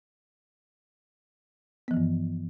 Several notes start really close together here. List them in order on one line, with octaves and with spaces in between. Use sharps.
B3 F3 E3 G2